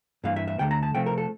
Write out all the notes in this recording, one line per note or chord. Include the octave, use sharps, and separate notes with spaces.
G2 E3 A#3 F5
E5
E5
D2 D3 A3 G5
A#5
A5
C3 F3 A3 C4 G5
A#4
A4